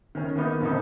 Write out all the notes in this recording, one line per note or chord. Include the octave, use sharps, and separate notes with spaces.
D#3 C#4
D#3 A#3 B3 D#4
F2 A#2 D3 A#3 D#4